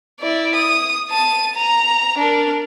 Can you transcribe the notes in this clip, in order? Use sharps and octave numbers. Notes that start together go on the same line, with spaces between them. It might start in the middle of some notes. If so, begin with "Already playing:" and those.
E4 D5
D#6
A5 D#7
A#5
D4 A#4